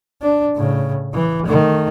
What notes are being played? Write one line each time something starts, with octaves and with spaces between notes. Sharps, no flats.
D4
A2 C#3
E3
D#3 A3